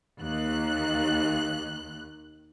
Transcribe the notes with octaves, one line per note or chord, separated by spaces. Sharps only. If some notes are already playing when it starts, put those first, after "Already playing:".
D#2 F#6